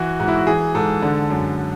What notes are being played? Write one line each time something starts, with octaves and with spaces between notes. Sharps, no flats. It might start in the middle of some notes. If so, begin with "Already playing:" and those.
Already playing: E3 F#4
G#2 F#4
E4
F#4
E3 G#4
G#2 A4
D3
F#2